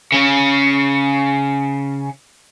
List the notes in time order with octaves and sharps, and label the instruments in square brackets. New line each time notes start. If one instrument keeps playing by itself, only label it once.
[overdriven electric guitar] C#3 C#4